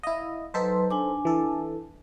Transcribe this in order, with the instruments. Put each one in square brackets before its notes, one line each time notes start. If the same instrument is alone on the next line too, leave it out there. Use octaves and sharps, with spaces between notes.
[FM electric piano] E4 D#5 [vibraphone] F5
[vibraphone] F#3 B4 C6 [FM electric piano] D#4 A4 C5
[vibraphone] D4 G#5 D6
[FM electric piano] E3 A4